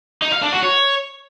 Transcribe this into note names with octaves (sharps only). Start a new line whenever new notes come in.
D#4
F5
D4
F#4
C#5